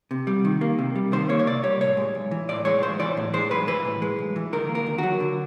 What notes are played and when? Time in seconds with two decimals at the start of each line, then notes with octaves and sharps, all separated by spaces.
0.11 C3
0.27 G3
0.45 D#3
0.61 A#3
0.79 C3
0.96 G3
1.12 D#3 C5
1.29 A#3 C#5
1.39 C#5
1.47 C3 D5
1.63 G3 C#5
1.81 A2 C#5
1.97 G#3
2.15 B1
2.31 E3
2.49 A2 D5
2.65 G#3 C#5
2.83 B1 C5
2.99 E3 D5
3.17 A2
3.33 G#3 C5
3.51 B1 B4
3.67 E3 B4
3.85 A2
4.02 G#3
4.19 B1
4.36 E3
4.53 D3 A#4
4.69 A#3
4.75 A#4
4.86 D#2
4.98 F#3 F#4
5.20 D3